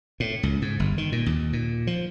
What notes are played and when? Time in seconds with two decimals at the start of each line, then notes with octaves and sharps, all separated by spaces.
0.20 A2
0.43 C#2
0.62 G#2
0.80 G1
0.98 D#3
1.12 A#2
1.26 D#2
1.53 A#2
1.87 F3